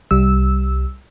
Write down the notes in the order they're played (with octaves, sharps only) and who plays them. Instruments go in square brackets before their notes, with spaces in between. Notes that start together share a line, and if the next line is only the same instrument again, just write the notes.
[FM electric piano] C2 G3 E6